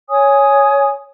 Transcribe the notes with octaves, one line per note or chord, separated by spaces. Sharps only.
C#5 G#5 D#6